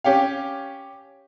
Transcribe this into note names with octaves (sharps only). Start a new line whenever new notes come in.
C#4 G4 C#5 F5